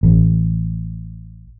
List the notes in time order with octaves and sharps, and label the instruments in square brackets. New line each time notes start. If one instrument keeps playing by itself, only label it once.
[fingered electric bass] A1